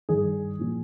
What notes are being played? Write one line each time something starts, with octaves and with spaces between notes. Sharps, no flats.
G2 D#3 G#4
A#2 F3